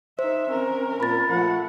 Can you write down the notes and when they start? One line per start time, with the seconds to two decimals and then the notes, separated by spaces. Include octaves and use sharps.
0.19 D#4 C5 E5
0.51 C4 C#4 A#4
1.00 A#2 B5 A6
1.30 F3 A3 F#5